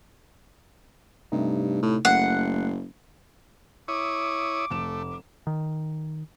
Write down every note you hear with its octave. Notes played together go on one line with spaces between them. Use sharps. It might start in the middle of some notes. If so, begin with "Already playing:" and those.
G2 C3 A3 D#4
A2
F#1 A3 F#5 C7
E4 C#5 D6 D#6
F1 A3 E7
D#3